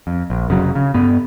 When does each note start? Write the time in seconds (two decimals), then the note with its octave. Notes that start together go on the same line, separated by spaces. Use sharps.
0.07 F2
0.30 A#1
0.48 F1 C#3 F#3
0.75 C#3
0.94 G2 B3